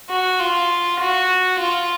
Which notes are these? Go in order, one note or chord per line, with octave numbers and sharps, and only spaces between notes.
F#4
F4
F#4
F4